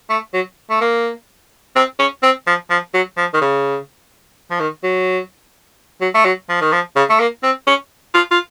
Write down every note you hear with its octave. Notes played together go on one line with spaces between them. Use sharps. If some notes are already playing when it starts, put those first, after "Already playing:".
A3
F#3
A3
A#3
C4
C#4
C4
F3
F3
F#3
F3
D#3
C#3
F3
D#3
F#3
F#3
A3
F#3
F3
D#3
F3
C#3
A3
A#3
C4
C#4
F4
F4